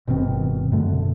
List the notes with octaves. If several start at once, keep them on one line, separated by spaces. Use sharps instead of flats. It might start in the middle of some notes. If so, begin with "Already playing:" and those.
G1 B2 D#3 C4
F#2 B2 D3 A3